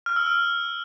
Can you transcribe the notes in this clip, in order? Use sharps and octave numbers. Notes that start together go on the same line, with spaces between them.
F6
E6
F6